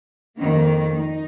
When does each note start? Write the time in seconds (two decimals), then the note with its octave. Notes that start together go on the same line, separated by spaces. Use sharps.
0.36 F2 D#3 A#3
0.96 D#4